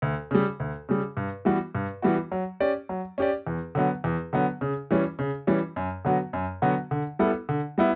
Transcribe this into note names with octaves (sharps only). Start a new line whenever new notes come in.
D2
C#3 G3
D2
C#3 G3
G2
E3 G3 B3 F#4
G2
E3 G3 B3 F#4
F#3
C#4 G4 D5
F#3
C#4 G4 D5
E2
D3 F#3 B3
E2
D3 F#3 B3
C#3
E3 G3 C#4
C#3
E3 G3 C#4
F#2
D3 F#3 B3 F#4
F#2
D3 F#3 B3 F#4
D3
G3 B3 E4 A4
D3
G3 B3 E4